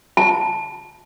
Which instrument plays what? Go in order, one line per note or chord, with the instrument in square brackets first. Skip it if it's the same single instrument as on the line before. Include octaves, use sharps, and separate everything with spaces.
[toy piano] A5